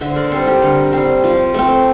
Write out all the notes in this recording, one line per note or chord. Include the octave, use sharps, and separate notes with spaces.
D3 C5 E5
A#4 D5
G3 C4 A4 C5
G4 A#4
D3
G3 C4
F3
A3 C4